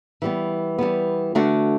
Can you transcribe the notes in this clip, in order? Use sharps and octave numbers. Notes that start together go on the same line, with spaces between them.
E3 G3 B3
E3 G3 B3
D3 A3 D4 F#4